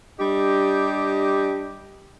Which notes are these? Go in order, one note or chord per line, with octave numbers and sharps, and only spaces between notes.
G3 D4 G4 D#5